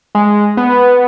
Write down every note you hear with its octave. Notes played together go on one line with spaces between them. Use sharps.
G#3
B3